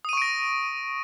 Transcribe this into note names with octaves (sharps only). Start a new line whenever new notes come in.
C#6 D#6 A#6 D7 D#7